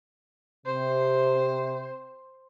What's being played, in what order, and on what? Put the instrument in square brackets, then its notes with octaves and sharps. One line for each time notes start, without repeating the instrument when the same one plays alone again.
[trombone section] C3 [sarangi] C5